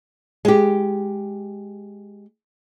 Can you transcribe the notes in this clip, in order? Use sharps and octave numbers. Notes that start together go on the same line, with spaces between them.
G#3 G4